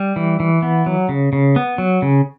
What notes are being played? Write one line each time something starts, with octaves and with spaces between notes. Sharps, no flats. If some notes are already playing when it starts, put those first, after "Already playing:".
Already playing: G3
E3
E3
B3
F#3
C#3
C#3
B3
F#3
C#3